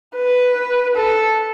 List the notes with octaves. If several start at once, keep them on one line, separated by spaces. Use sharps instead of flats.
B4
A4